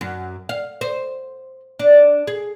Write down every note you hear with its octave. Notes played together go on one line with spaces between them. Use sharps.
F#2
F5
C5
D4
G#4